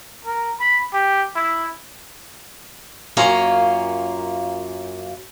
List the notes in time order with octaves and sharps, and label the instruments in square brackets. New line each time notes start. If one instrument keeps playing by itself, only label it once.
[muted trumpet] A#4
B5
G4
E4
[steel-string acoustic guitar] F#2 A#3 C#4 F4 F5 A#5